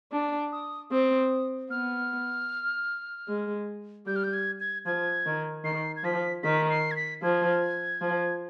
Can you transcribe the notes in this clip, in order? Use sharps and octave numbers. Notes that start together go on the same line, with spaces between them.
D4
D#6
C4 D#6
B3 F6
G#3
G3 G6
F6
G6
G#6
G#6
F3 G#6
D#3
D#3 C7
G#6
F3 B6
D#3 B6
C7
G#6
B6
F3 G#6
F3